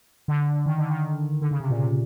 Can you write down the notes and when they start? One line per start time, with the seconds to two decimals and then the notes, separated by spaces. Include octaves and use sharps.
0.28 D3
0.66 D#3
0.78 D3
0.90 D#3
1.42 D3
1.51 C#3
1.60 C3
1.70 A#2
1.79 C3